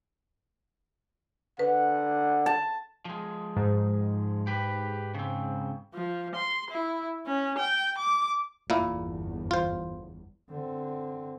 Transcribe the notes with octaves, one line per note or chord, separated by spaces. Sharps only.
D3 B4 F#5
A5
F3 G#3
G#2
G4 B4
C#3 C4
F3
C6
E4
C#4
G5
D6
G1 E2 A#2 A#3 E4
F4 C5
D3 C4